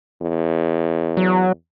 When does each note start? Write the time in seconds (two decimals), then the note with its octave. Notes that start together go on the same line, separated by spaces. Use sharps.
0.22 E2
1.17 F#3